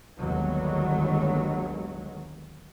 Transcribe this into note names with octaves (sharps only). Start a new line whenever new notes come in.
G1 D#2 D#3 F#3 G#3 B3